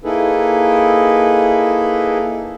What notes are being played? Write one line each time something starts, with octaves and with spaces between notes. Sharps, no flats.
A#3 D#4 E4 G#4 A4 B4